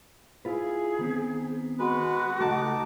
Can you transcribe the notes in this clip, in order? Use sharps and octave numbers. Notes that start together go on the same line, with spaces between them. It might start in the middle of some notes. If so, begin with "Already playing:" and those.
E4 F4 G#4 B4
D#3 B3 C4
G#3 F#4 B4
C#2 A3 D#4 A5 D6